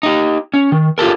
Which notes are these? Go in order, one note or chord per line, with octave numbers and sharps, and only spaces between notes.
D#4 G4
C#4
D#3
F4 G4 A4 A#4